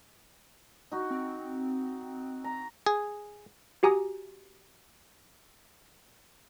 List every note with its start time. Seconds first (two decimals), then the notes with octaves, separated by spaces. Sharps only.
0.92 D#4 F#4
1.11 C4
2.44 A#5
2.86 G#4
3.83 F#4 G4 G#5 A#5 D#6